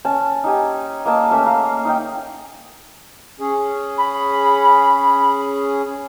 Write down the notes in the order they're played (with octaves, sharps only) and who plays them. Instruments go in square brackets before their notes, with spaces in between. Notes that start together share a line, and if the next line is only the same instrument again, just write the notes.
[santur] C#4 A5
D#4 G4 G#5
A#3 D#5 A5 E6
A3 A#3 C#4 E5
F5 A#5
D#4 D#5 G5
[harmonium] C#4 G#4
[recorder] B5